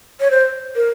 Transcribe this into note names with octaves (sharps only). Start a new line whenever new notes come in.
C#5
C5
A#4